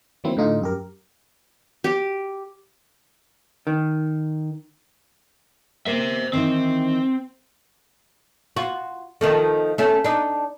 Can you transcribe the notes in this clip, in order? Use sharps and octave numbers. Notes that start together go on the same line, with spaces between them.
D#3 E3 F#3 A#3 C4 E4
A2 D3 D#4 F4
F#2 G4 A#4
G4
D#3
A#3 C5 E5
D#3 E3 C4 D#4
F4 F#4
D#3 F3 A3
A3 C#4
D4 D#4